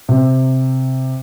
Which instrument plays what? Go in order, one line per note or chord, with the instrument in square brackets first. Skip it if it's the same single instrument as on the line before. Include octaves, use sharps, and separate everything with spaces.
[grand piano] C3